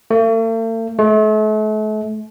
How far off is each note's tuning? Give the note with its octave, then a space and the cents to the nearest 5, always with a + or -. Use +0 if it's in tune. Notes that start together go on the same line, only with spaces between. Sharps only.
A3 +45
A3 -40